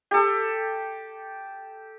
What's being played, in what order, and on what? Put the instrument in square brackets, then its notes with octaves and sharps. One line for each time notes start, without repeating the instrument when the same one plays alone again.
[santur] G4 A4